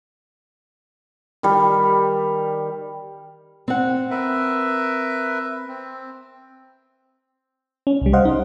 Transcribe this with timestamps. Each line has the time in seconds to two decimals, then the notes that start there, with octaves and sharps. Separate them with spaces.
1.43 D#3 G3
3.68 C4 F#5
4.11 A#4 B4 E5
5.68 C4
7.87 C#4
8.02 C2 G3
8.13 C5 D#5 F5 F#5
8.25 D#4